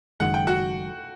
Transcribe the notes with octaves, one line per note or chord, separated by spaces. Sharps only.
F#1 F#2 D#3 G#3 F#5
G5
F#4 F#5